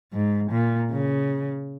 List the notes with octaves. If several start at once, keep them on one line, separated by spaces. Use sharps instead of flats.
G#2
A#2
C#3